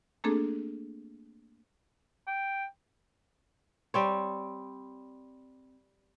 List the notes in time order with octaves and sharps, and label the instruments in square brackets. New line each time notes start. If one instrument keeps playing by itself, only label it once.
[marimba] A3 A#3 C4 D4 G#4 A4
[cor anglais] G5
[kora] G3 C4 C#5